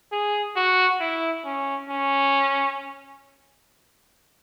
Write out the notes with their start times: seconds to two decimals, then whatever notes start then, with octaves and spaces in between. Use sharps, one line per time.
0.12 G#4
0.56 F#4
1.00 E4
1.45 C#4
1.89 C#4